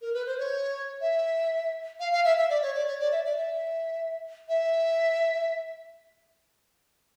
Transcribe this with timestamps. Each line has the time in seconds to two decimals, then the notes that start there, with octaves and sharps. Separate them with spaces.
0.01 A#4
0.14 B4
0.26 C5
0.38 C#5
1.01 E5
2.00 F5
2.12 F5
2.25 E5
2.37 E5
2.50 D5
2.62 C#5
2.74 D5
2.87 C#5
2.99 D5
3.12 E5
3.24 D5
3.37 E5
4.48 E5